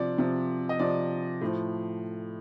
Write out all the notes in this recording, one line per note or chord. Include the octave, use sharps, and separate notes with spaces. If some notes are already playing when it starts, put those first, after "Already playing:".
Already playing: C3 F3 D5
C3 F3
D#5
C3 F3 D5
A2 F3